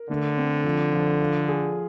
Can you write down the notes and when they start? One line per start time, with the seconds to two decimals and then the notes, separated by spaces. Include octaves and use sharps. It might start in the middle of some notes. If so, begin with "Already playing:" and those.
Already playing: A#4
0.09 D3 A3
0.37 C4
0.64 F3
0.93 F3
1.21 F4
1.48 G#4